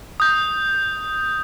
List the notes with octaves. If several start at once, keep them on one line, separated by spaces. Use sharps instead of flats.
D#6 G6